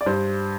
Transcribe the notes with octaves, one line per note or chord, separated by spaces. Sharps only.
D5
G2 C5